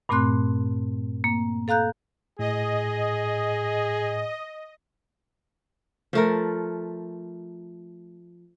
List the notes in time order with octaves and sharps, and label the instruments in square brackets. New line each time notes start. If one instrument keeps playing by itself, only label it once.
[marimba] G2 A#2 A3 C4 C6 F#6
A#3
A4 F5 A#5 F#6 G6
[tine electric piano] A2 [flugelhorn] G#4 [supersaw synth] D#5
[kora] F3 A3 A#4